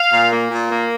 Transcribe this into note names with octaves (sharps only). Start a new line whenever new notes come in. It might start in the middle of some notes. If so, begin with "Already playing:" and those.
Already playing: F5
A#2
A#3
A#2
A#3